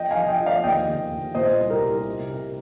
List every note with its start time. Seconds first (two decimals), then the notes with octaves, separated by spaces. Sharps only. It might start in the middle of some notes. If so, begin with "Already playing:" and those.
Already playing: F3 D#5 G5
0.11 F5 G#5
0.17 F3
0.28 D#5 G5
0.40 F3
0.46 D5 F5
0.64 D#2 D#5 G5
0.88 D#2
1.11 D#2
1.35 A#2 C5 D#5
1.59 C2
1.70 G4 A#4
1.82 C2
2.05 C3
2.29 C3